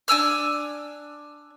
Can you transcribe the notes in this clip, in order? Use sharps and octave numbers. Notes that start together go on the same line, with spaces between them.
D4 G#5 E6 F6